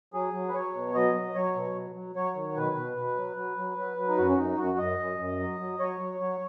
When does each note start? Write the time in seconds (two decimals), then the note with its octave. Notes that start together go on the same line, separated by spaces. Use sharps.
0.14 F#3 G#4
0.34 F#3
0.49 B4
0.54 F#3 C#5
0.75 B2
0.94 F#3 D#5
1.15 F#3
1.35 F#3 C#5
1.56 B2
1.75 F#3
1.95 F#3
2.15 F#3 C#5
2.36 D#3
2.56 B2 B4
2.76 B2
2.97 B2
3.17 F#3
3.37 F#3
3.58 F#3
3.78 F#3
3.97 F#3
4.08 D#4
4.18 F#2 F#4
4.29 C#4
4.38 F#2 D#4
4.58 F#2 F#4
4.78 F#2 D#5
4.99 F#2
5.19 F#2
5.39 F#3
5.60 F#3
5.79 F#3 C#5
6.00 F#3
6.21 F#3